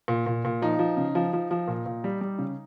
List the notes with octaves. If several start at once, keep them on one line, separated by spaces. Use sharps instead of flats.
A#2
A#2
A#2
F3 D#4
F3
C#3
F3
F3
F3
A#2
A#2
G3
G3
C#3